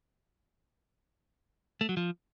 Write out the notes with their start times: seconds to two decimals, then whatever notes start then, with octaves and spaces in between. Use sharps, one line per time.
1.81 A3
1.89 F#3
1.97 F3